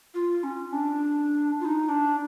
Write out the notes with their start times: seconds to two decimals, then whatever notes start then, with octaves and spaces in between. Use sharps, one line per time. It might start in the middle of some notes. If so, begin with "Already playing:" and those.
0.14 F4
0.44 C#4
0.72 D4
1.60 F4
1.65 D#4
1.89 D4